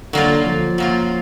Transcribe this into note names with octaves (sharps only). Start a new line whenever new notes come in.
D3 F#3 A#3 F4
F3
F#3 A#3 F4